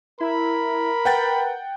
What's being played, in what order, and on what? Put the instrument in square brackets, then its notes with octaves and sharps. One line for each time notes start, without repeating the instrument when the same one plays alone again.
[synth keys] E4 [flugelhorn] A#4 [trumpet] B5
[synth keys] B4 [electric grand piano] F#5 G5 A6